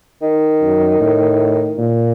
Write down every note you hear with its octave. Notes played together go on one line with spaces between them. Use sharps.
D#3
F#2
A2
A#2